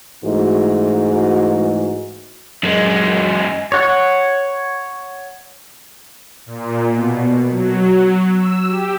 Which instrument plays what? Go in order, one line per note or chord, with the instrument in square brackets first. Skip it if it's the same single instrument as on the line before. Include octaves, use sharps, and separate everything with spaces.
[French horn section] G#2 E3 G#3 A3 F#4
[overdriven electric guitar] F#2 G#3
[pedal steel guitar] C#5 F#5
[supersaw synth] A#2
B2
F#3
E6
G4